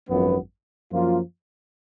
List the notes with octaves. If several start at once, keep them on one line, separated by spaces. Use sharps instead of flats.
G#1 F#2 F3 B3
F#2 F3 A#3 F4